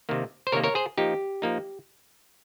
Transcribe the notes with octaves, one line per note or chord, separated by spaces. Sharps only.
C3 D#3 A#3
C5
C3 D#3 A#3 A#4 C#5
A#4 C#5
G#4 C5
F3 A#3 D#4 G4
F3 A#3 D#4